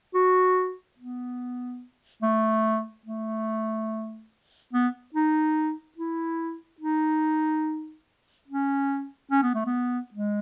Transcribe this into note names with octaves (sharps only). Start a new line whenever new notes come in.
F#4
B3
A3
A3
B3
D#4
E4
D#4
C#4
C#4
B3
A3
B3
G#3